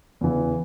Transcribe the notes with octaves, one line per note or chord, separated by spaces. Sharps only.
E2 C#3 E3